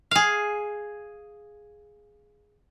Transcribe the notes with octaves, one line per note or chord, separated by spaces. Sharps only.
G#4 F5